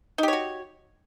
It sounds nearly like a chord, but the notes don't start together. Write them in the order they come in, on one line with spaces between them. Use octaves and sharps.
D#4 G4 C#5 F#4